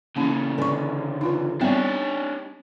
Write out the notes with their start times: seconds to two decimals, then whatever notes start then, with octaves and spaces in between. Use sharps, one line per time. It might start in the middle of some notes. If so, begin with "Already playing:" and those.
0.17 C#3 E3 A#3 C#4 D#4
0.58 D3 C#4 B4 C#6
1.21 D#4 F4 B4
1.61 G3 B3 C4 D4 D#4 C#5 E5